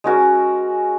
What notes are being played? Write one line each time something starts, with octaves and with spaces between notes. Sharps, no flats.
G#3 C#4 F#4 A#4